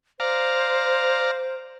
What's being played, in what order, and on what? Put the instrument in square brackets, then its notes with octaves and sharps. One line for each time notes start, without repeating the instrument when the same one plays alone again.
[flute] C5 [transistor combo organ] D5 F5 A#5